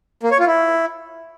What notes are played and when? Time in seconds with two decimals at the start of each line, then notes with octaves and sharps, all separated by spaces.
0.23 A#3
0.31 C#5
0.39 F4
0.47 E4